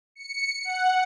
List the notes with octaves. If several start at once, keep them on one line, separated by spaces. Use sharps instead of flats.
C#7
F#5